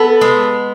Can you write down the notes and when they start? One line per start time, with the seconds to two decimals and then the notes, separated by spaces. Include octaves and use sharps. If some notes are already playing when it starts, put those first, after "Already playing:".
Already playing: B3 A4
0.21 G#3